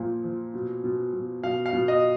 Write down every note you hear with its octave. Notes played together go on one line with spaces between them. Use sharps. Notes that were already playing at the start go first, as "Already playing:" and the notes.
Already playing: A#2 F3
F3
B2
B2
B2
B2 F5
F5
B2
D#5